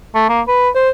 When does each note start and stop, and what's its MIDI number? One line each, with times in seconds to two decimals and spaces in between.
0.15 0.28 57
0.29 0.41 58
0.48 0.69 71
0.75 0.90 72